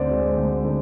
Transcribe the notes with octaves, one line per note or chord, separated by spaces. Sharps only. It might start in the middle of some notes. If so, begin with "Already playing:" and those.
Already playing: D2 D3 C4 C5 D5
G#3
D2
D3